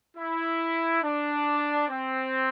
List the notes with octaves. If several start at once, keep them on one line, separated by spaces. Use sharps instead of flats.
E4
D4
C4